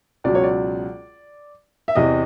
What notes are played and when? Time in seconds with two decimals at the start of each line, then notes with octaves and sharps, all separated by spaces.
0.24 C#2 B2 F#3 D5
0.35 C#5
0.44 D5
1.88 E5
1.95 E2 C3 E3 D#5